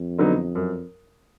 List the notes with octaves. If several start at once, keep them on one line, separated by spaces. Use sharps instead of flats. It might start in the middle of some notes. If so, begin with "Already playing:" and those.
Already playing: F2
D3 F#3 B3 D#4
F#2